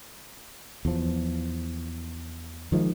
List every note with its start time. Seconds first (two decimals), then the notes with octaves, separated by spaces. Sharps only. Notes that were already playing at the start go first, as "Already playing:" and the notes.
0.85 E2 F3
2.72 D#3 F3 G#3